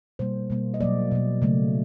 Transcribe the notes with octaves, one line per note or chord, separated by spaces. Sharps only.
B2 G3 A#3 C5
B2 G3 A#3
D#5
B2 F#3 A#3 D5
B2 F#3 A#3
C#3 F#3 A3